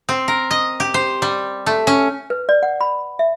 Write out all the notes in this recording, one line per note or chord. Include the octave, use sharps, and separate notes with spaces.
C4
A#4
D#5
G4
C5
G3
A3
C#4
B4
D5
F#5
B5
E5